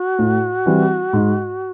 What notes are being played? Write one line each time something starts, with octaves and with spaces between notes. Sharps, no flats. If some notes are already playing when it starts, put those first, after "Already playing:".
Already playing: F#4
A2
E3 G3 C4 E4
G#2